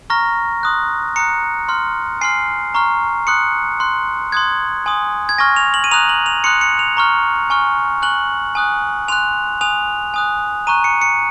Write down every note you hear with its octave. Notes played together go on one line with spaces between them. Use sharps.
A#5 C#6 F6 A#6
C6 D#6 F#6
A#5 D#6 F#6 C#7
C6 F6
G#5 C6 F6 C7
A#5 C#6 F6
C6 D#6 F#6 C#7
C6 F#6
C6 D#6 F#6 G#6
G#5 C6 D#6
G#6
G#5 C#6 F6 A#6
F7
F#7
D#7
A#5 D#6 F#6 F7
F#7
F7
C6 D#6 F#6 C#7
C#7
F7
A#5 C#6 F6
G#5 C#6 F6
G#5 C#6 F#6 F#7
G#5 D#6 F#6
G#5 C6 F#6 F7
G#5 D#6 F#6 F7
G#5 D#6 F#6
A#5 C#6 F#6 D#7
C#7
C#7